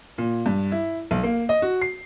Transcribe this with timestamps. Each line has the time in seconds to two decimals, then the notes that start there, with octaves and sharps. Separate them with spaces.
0.18 A#2
0.46 G2
0.72 E4
1.11 B1
1.23 A#3
1.49 D#5
1.62 F#4
1.82 C7